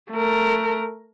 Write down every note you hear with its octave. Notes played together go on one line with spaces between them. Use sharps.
A3 A#4